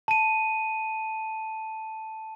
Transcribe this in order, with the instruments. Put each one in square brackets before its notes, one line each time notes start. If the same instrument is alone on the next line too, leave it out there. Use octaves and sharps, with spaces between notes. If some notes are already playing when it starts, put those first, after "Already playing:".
[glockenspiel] A5 D#7